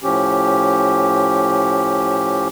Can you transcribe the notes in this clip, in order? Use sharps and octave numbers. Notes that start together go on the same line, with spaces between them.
A2 F3 C#4 G4